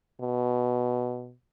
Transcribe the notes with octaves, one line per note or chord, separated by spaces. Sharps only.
B2